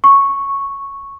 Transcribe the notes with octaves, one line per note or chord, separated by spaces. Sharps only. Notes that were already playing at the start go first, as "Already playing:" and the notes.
C#6